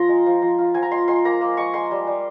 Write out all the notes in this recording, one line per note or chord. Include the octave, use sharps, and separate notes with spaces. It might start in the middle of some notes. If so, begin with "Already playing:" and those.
Already playing: F3 F4 A#5 C6
G#3
F3
F3
F4
F3 G#5
A#5
G#3 C6
G#3 C6
A#3 A#5
A#3
G#3 C#6
G#3 C6
G3
G3